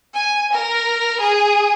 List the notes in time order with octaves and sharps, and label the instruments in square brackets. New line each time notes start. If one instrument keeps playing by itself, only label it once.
[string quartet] G#5
A#4
G#4